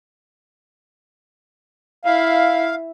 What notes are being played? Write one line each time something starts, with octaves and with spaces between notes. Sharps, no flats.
E4 F5